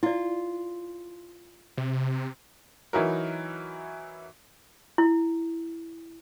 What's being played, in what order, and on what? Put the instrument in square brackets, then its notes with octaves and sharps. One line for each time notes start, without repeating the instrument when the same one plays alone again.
[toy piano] E4 D5 [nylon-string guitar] F4
[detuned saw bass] C3
[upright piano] E3 F#3 D#4 E4 F#4 A#4
[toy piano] E4